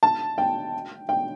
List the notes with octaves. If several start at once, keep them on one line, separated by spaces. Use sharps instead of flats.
A5
G5
G5